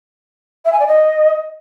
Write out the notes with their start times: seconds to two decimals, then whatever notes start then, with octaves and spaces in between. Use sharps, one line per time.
0.65 E5
0.72 G#5
0.79 D5
0.87 D#5